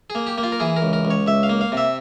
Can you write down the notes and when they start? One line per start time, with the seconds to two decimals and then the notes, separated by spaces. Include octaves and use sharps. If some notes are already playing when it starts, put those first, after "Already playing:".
0.10 G#4
0.15 A#3
0.27 G4
0.38 A#3
0.43 F4
0.52 A#4
0.60 E3 G#4
0.76 A#4
0.82 C#2
0.93 A#4
1.05 C#2
1.11 C#5
1.26 C#2 E5
1.43 F5
1.49 A#3
1.61 F5
1.72 C3 E5